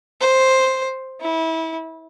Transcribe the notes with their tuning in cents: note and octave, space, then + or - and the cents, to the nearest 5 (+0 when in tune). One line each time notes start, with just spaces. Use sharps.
C5 +5
E4 -25